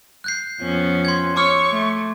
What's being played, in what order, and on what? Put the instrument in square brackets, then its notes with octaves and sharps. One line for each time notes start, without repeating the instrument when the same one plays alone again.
[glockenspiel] F#6 G6 C7
[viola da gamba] F2 B3 C#4
[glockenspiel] C6 G#6
[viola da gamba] C#5 [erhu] C#6 [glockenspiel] D6 E6 F6
[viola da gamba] A3